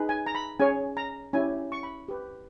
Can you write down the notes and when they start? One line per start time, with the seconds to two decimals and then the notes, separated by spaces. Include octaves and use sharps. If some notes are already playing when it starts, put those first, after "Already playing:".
Already playing: D#4 G#4 B4
0.09 G#5
0.26 A#5
0.35 B5
0.60 C#4 G#4 C#5 G#5
0.97 A#5
1.33 C#4 E4 G4 G#5
1.72 C#6
1.83 B5
2.08 G4 B4